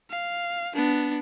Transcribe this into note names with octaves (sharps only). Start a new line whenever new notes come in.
F5
B3 D4